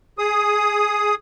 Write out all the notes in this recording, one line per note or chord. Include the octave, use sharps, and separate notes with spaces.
G#4 D#6